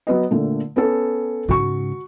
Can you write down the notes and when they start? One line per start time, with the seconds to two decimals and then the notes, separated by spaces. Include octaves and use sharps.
0.07 F#3 B3 D#5
0.31 A#2 D3 A3
0.76 B3 C#4 A4
1.49 G#2 C#3 F#4 C#6